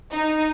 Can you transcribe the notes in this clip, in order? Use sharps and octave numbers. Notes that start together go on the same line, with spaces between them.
D#4